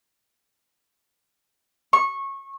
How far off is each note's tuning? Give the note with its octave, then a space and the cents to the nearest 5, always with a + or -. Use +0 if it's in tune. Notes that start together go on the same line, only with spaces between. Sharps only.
C#6 -20